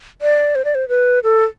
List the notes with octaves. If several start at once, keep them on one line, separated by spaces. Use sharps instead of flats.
D5
C5
D5
C5
B4
A4